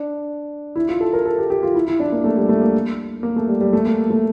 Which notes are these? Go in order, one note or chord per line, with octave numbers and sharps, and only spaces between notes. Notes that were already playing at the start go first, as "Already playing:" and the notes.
Already playing: D4
E4
F4
A4
A#4
A4
G4
G4
F4
E4
E4
D4
A#3
A3
G3
A3
A#3
A#3
A3
G3
G3
A3
A#3
A3